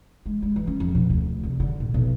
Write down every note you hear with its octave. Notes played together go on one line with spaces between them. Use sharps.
G#3
G#3
E3
C#4
F2
B2
D2
C2
D3
A#2
B1